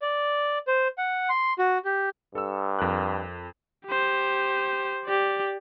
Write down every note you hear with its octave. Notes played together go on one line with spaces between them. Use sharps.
D5
C5
F#5
C6
F#4
G4
G2 A4 E6
F2 A#4 F#6
G4 C5
G4 D5